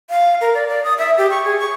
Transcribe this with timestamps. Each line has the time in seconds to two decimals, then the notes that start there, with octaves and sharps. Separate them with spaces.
0.10 F5
0.41 A#4
0.54 D5
0.68 D5
0.84 D#6
0.98 E5
1.18 G4
1.30 C#6
1.45 G#4
1.59 C#6